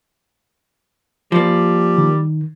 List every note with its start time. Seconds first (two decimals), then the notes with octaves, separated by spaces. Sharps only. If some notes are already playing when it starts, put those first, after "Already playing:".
1.32 F3 G3 A#3
1.98 D#3